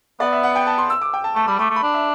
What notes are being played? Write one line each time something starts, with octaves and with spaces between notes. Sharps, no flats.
B3 D5
E5
F#5
G5
A5
C6
E6
D6
G5
A5
A3 A5
G3 B5
A3 D6
A3
B5
D4
E5